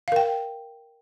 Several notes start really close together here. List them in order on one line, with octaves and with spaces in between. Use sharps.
F5 A#4 G5